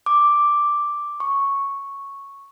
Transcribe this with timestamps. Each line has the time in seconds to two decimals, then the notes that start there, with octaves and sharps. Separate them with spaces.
0.06 D6
1.20 C#6